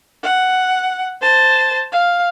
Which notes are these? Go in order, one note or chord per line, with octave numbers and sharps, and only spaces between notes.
F#5
C5 A5
F5